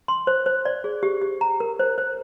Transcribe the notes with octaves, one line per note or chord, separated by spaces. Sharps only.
C6
C5
C5
D5
G#4
G4
G4
A#5
A#4
C5
C5